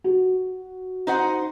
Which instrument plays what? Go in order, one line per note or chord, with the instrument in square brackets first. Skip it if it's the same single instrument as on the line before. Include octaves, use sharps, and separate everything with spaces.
[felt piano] F#4
[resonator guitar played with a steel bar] D#4 C5 F#5